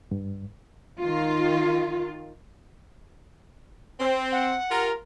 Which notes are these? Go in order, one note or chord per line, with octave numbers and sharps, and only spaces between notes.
G2
D#3 F4
C4
F#5
F4 G4 A#4